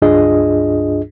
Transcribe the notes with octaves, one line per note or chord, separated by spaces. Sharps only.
C#2 G2 D4 F4 G#4 D#5